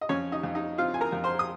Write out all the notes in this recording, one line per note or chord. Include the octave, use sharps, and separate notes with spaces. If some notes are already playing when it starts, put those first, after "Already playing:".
D#5
F2 C#4 C#5
D#4 D#5
F2
D#4 D#5
C4 F4 F5
G#5
A#4 A#5
F2
C5 C6
D#6